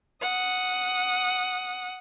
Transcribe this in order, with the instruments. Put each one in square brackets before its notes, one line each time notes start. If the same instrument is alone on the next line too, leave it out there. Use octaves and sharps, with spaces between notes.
[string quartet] F#5 D#6